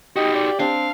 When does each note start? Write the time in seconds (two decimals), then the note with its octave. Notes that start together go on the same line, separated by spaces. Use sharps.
0.16 D#4 F#4 G4 D#5
0.35 D5
0.60 C4 D4 F5